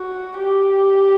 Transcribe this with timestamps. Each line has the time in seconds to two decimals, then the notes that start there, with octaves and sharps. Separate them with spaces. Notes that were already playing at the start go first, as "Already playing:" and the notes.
Already playing: F#4
0.38 G4